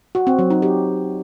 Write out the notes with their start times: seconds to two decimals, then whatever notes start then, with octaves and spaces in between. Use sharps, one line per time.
0.15 F#4
0.27 C4
0.39 F#3
0.50 D#4
0.62 G4